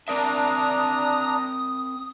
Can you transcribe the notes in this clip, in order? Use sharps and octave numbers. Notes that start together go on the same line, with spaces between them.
C4 D4 A#4 E5 A#5 D#6